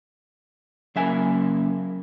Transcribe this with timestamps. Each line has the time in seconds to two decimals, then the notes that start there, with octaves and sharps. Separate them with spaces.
0.96 C#3 F#3 A#3 E4 E5 G#5